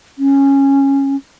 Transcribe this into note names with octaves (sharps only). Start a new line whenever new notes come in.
C#4